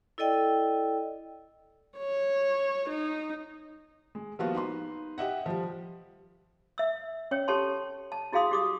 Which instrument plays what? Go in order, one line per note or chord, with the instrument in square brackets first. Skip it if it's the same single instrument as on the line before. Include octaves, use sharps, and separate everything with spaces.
[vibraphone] E4 A4 D5 D#5 G5
[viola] C#5
D#4
[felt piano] G#3
F3 G3 A#3 B3 F4 F#4
D#4 B4 C6
G4 D#5 E5 F#5
F3 G3
[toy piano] E5 E6
C#4 C#5 G5
G4 A4 C#5 A5 C6
A5
E4 F#4 G#4 F5 C6 D#6
G4 D6 D#6